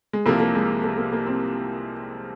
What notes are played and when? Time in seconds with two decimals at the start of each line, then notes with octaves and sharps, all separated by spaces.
0.13 G#3
0.26 C2 C3 F3 A#3
0.40 A#3
0.55 G#3
0.84 A#3
0.98 A#3
1.13 A#3
1.27 C4